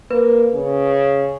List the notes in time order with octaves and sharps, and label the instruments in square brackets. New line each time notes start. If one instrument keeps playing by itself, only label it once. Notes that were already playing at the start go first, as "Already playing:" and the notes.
[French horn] A#3 [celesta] B4
[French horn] C#3